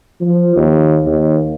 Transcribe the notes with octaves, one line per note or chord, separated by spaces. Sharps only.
F3
D#2
D#2